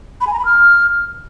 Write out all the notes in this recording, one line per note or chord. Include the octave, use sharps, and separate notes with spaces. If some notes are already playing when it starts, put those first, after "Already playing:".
B5
G#5
A#5
B5
F6